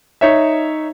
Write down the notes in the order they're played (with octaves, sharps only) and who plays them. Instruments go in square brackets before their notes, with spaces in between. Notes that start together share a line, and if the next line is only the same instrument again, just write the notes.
[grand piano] D#4 C#5 E5